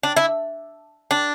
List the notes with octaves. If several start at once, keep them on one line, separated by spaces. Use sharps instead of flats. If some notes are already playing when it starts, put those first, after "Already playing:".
D4
E4
D4